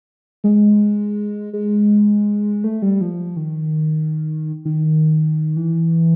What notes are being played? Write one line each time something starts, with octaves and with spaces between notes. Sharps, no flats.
G#3
G#3
A3
G3
F3
D#3
D#3
E3